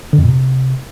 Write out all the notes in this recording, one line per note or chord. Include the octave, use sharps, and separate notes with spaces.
D3
F2
A#2
C3